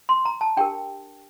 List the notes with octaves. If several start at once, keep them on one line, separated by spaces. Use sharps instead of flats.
C6
A#5
A5
D4 G4 A#4 G5